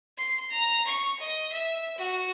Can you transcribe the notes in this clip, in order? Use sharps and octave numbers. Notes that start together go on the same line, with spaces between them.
C6
A#5
C#6
D#5
E5
F#4